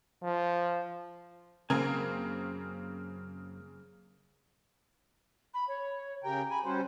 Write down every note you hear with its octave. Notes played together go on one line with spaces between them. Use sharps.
F3
F#2 C#3 A#3 C4 A#4 G#5
B5
C#5
C#3 G4 A#4 G5
G#5 B5
G3 C#4 F#4 C5